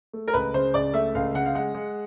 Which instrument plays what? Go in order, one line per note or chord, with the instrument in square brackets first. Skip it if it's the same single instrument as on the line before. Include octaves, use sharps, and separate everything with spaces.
[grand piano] A3
[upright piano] A#4
[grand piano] C#2 [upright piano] B4
[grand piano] C#3 [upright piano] C5
[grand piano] C#2 [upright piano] D5
[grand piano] A3 [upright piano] E5
[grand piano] C#2 [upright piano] F5
[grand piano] C#3 [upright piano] F#5
[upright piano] F5
[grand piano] G#3 [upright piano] F#5
[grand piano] G#3